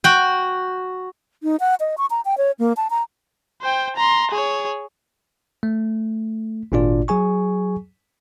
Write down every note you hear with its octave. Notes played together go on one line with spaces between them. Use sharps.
F#4 G5
D#4
F#5
D#5
C#6
A#5
G5
C#5
A#3
A5
A#5
C5 G5
A#5 C6
G#4 C#5
A3
G#1 A#2 D4 F4 D5
F#3 G#4 G#5 C#6